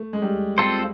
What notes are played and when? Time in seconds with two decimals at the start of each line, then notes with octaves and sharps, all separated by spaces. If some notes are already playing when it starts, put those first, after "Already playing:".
Already playing: A3
0.13 G#3
0.22 G3
0.58 C4 F4 A4 C5